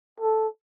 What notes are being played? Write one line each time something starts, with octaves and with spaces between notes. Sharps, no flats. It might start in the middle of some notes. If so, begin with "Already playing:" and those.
A4